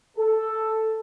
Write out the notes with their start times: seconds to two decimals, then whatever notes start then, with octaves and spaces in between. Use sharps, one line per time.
0.17 A4